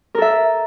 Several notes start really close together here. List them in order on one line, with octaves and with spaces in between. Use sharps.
A#4 A4 E5